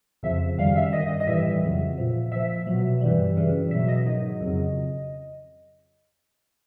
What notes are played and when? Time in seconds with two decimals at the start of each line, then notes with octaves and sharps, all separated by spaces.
0.23 F2 C#3 F3 E5
0.58 F#2 D#3 G3 F5
0.76 E5
0.93 G2 D#3 G3 D#5
1.20 D#5
1.27 A2 E3 G3 E5
1.62 F2 C#3 F#3
1.98 A#2 F3
2.32 A#2 F3 E5
2.67 B2 F#3
3.01 G2 E3 G3
3.36 F#2 C#3 E3 G3
3.71 B2 F#3 E5
3.88 D#5
4.06 G#2 D#3 F#3 D#5
4.41 F2 C#3 F#3